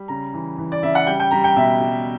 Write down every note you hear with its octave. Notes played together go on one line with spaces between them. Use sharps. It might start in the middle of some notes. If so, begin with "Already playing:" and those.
Already playing: G3
C#3 A#5
E3
E3
D5
C#3 E5
F#5
G3 G5
G5
G3 A#5
G5
B2 E5
G3